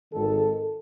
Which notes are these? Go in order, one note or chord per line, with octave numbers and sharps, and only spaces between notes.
G#1 G#2 D#3 A4